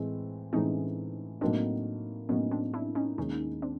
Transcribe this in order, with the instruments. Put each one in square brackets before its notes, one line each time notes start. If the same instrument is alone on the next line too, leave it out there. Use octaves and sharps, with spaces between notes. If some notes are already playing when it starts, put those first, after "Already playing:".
Already playing: [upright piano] A2 E3 G#3 C4
[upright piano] A2 E3 G#3 C4 [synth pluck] C#4 D#4
[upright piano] A2 F#3 A#3 D#4 [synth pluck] C4 D4
[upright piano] A2 F#3 A#3 D#4 [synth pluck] B3 C#4
[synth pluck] C4 D4
D4 E4
C#4 D#4
[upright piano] D#2 D#3 G#3 [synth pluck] C#4 D#4
[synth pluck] C4 D4